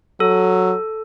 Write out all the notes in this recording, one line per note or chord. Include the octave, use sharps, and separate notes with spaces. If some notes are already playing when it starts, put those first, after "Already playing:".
F#3 A4